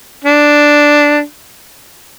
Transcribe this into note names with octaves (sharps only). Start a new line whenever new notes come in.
D4